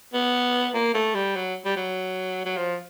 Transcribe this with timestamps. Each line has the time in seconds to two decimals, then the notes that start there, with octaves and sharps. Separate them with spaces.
0.14 B3
0.74 A#3
0.94 A3
1.15 G3
1.36 F#3
1.65 G3
1.76 F#3
2.46 F#3
2.57 F3